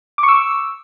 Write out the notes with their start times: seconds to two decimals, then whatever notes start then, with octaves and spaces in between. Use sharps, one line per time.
0.18 D6
0.23 C#6
0.28 E6